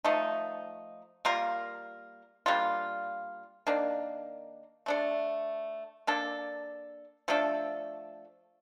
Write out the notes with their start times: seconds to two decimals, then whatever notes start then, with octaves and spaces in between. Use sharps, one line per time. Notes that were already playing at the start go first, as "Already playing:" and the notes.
0.04 F3 A3 D#4
1.25 G3 A#3 F4 A#4
2.46 G3 A#3 D4 F4
3.67 D#3 A#3 D4
4.86 A3 D4 A4
6.07 A#3 D4 A4
7.28 F3 A3 D4 A4